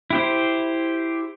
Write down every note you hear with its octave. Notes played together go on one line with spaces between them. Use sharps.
E4 G4 C5